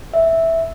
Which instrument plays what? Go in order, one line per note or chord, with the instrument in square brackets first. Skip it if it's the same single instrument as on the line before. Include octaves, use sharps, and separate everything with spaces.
[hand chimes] E5